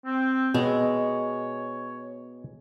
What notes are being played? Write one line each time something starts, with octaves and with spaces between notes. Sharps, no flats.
C4
B2 G#3 C#5